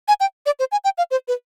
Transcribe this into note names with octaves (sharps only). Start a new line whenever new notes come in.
G#5
G5
D5
C5
G#5
G5
F5
C5
B4